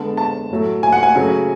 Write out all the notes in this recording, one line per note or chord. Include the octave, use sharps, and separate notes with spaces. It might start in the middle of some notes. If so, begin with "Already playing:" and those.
Already playing: D3 G#3 B3 A5
A5
A2 F#3 A3
G#5
F#5
G#5
C#3 F#3 A3